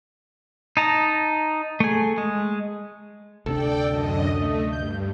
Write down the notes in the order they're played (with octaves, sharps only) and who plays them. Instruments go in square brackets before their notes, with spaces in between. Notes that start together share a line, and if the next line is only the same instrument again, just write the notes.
[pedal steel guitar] D#4 A5 A#5
A3 G#4
G#3
[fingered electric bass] D2 C3 D4 [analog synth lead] A4 [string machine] D5 G5
[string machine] F#2 D3 D#5
[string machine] A3 [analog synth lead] D#5
[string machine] G2 [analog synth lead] G6